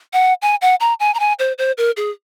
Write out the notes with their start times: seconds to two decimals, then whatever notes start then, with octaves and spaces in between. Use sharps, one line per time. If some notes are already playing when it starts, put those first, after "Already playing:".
0.13 F#5
0.42 G#5
0.62 F#5
0.80 A#5
1.00 G#5
1.14 A#5
1.20 G#5
1.39 C5
1.58 C5
1.78 A#4
1.97 G#4